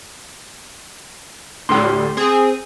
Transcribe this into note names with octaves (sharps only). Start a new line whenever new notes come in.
D2 A2 G3 C6
C4 G#4